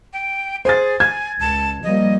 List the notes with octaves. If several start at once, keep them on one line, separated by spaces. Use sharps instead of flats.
G5
G#4 C5 A6
G#5 G#6
C#2 A5
F3 G3 A#3 D#5